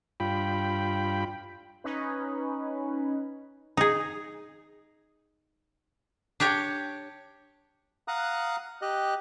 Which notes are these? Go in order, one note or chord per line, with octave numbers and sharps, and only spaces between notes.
G2 F4 G5 B5
C#4 D#4 B4
D#4 G#4
D4 G4 C#5 G5
F5 F#5 A#5 D#6 F#6
G4 D#5 F#6